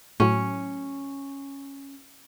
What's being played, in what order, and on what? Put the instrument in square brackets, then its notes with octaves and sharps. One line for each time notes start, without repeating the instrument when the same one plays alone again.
[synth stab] A2 F#3 [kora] C#4